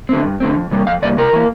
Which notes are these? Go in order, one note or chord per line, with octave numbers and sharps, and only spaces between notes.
D3 A3 C4
G2
D3 A3 C4
F2
C3 G3 A#3
F2 F5
C3 G3 A#3 D5
C3 A#4
E3 A#3